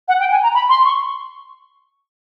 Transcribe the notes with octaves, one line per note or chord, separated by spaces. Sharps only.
F#5
G5
G#5
A#5
B5
C6
C#6